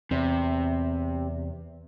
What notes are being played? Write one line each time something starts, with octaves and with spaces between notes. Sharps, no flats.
E2 C3